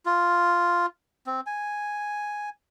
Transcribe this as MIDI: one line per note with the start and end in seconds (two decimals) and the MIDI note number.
0.06 0.86 65
1.27 1.41 60
1.47 2.49 80